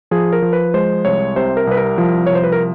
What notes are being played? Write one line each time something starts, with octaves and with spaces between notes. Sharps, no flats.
F3 G#4
A#4
F3
B4
G#3 C5
C2 C#5
C3 C5
A#4
C2 B4
A#4
F3
C2 C#5
C5
B4
A#4